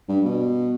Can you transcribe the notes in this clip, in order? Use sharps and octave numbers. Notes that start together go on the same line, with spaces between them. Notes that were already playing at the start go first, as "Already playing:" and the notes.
G2
B2